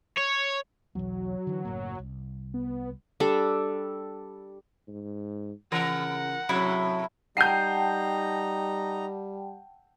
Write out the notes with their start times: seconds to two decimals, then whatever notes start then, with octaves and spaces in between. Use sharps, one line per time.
0.18 C#5
0.95 B1 E2 F#3
1.47 D3 E3
1.65 F#1 A2 A#3
1.99 C2
2.54 B3
3.20 G3 D4 A4
4.88 G#2
5.72 C#3 E3 A#4 F#5
6.49 A2 C3 F#3 E4
7.37 G3 D#4 F#5 G5 A5 A#5 G6 C7